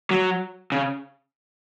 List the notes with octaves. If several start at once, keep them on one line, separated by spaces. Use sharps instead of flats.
F#3
C#3